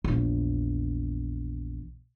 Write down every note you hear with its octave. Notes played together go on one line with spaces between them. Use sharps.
A#1 E2